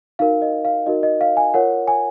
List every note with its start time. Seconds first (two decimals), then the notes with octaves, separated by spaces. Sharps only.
0.19 D#4 F#4 A#4 F5
0.42 D#5
0.65 F5
0.86 D#4 F#4 A#4 D#5
1.03 D#5
1.21 F5
1.37 G#5
1.54 F4 A#4 C#5 F#5
1.88 G#5